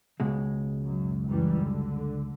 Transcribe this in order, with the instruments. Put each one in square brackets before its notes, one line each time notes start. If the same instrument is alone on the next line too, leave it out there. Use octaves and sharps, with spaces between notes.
[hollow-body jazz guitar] C#2 B2 G#3
[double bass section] F#2
F#2 E3 G3
D3